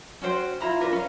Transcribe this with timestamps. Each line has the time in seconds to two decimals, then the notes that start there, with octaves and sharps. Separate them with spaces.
0.22 C#4 F#4 C5 G5
0.60 E4 F4 A#5 B5
0.80 D4 F4 A#4 B4
0.92 C#4 F5